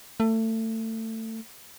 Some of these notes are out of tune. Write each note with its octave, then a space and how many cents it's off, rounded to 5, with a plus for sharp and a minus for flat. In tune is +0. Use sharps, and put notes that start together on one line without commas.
A3 +25